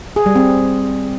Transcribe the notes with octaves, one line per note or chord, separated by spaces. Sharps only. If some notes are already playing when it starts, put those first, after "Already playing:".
G#4
G3
C4